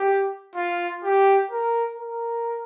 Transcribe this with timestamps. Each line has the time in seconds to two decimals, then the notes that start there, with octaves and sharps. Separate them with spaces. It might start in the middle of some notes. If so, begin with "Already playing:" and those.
Already playing: G4
0.55 F4
1.03 G4
1.50 A#4
1.97 A#4